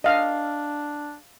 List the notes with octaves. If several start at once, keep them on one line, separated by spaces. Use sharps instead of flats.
D4 D#5 F5